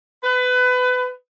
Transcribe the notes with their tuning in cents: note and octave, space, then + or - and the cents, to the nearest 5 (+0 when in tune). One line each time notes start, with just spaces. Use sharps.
B4 +25